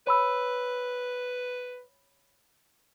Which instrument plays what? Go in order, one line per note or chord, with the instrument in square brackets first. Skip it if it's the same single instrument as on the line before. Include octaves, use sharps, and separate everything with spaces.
[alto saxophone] B4 [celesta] C#5 B5 E6